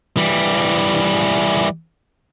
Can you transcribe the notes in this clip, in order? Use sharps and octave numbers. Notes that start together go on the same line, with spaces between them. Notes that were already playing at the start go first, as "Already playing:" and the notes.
E3 G3